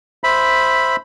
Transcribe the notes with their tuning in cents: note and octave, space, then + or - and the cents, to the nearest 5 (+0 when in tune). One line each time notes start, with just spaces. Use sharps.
C5 +0 E5 +0 B5 +0